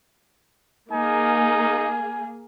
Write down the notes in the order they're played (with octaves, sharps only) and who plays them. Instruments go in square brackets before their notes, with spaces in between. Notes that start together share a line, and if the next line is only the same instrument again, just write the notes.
[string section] A#3 G#4 [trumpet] D#4 [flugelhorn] G#5